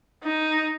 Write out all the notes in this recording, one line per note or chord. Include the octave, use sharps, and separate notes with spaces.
D#4